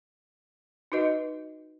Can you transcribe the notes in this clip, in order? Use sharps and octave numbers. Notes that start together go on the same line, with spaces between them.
D#4 F#4 B4 D#5